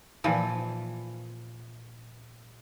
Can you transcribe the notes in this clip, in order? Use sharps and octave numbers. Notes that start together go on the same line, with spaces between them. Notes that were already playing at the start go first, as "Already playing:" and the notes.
A#2 E3 F3